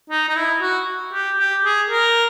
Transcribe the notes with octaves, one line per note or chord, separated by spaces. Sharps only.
D#4
D#4
E4
F#4
G4
G4
G#4
A#4